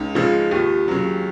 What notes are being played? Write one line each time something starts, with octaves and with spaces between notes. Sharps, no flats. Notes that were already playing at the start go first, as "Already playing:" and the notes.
Already playing: C#2 C#4 D#4
C#3 F3 G#3 D#4 F4
D#2 F4 G4
C#3 F#3